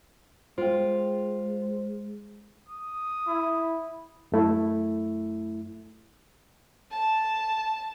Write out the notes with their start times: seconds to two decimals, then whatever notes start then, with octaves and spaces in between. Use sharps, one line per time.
0.58 G#3 F4 C5 G5
2.69 D#6
3.27 E4
4.32 F#2 A3 E4
6.92 A5